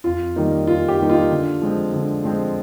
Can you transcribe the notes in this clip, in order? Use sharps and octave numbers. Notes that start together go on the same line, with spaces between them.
F2 F4
D#3 G3 A#3 D#4
F2 F4
G4
D#3 G3 A#3 D#4
F4
D3
F3 G#3 C4
D3
F3 G#3 C4